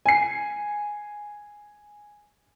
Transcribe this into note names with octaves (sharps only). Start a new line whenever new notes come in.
G#5 C7